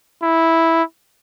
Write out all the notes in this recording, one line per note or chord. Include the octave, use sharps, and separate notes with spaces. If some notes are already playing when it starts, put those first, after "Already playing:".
E4